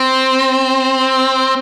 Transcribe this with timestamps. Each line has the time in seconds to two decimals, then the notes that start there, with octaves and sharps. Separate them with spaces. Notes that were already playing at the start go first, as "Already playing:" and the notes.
Already playing: C4